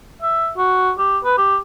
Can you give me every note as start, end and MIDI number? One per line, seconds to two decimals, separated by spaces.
0.22 0.51 76
0.58 0.92 66
0.98 1.19 67
1.24 1.36 71
1.38 1.58 67